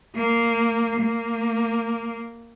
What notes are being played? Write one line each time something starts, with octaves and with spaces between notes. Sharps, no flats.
A#3
A#3